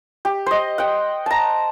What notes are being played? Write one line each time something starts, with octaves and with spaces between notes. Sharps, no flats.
G4
C5 D#5
F#5 G5
A5 A#5